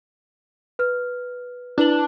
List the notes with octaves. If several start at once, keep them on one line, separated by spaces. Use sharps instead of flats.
B4 F6
D4 E4 B4 F#7